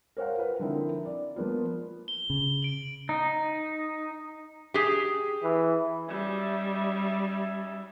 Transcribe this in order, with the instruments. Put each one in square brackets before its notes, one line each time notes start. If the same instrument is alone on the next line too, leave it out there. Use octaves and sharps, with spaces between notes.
[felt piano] A#4 C5 C#5 F5 F#5
F4 B4 F#5
D3 F3 C4 D#4 E4 A#4
D5
F3 A#3 B3 F4
[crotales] G7
[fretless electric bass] C#3
[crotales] D7 F#7
[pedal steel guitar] D#4
[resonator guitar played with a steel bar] G4 G#4
[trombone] E3
[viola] G3 [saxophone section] C#4 D#4 E5